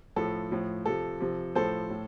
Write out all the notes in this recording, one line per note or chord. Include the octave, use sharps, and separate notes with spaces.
A2 F3 A4
A2 F3
C3 F3 A4
C3 F3
A2 F3 A4 C5
A2